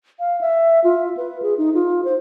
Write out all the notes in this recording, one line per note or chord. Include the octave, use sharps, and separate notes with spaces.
F5
E5
F4
B4
G#4
D#4
F4
C5